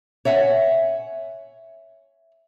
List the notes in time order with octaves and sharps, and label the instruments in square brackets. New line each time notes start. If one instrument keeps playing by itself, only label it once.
[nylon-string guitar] C#5 E5 F#5 G#5